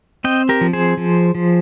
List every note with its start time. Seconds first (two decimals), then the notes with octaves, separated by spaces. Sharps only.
0.24 C4 D#5 G5
0.49 G4 A#4
0.61 F3
0.73 G#4 C5
0.97 F3
1.35 F3